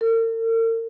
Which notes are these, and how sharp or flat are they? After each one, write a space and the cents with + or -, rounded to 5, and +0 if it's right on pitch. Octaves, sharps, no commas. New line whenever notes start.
A#4 -45